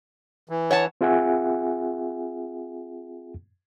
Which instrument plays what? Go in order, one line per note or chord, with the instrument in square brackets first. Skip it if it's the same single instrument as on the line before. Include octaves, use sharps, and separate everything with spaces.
[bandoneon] E3
[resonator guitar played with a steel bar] C#5 F#5 A5
[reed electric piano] C4 F4 G#4 E5 F#5 G#5